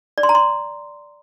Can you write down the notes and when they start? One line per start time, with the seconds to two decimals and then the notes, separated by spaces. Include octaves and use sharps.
0.18 D5
0.23 C6
0.29 A#5
0.35 C6